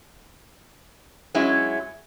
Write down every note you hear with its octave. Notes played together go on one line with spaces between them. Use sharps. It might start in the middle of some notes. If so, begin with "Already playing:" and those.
F#3 G#3 C#4 E4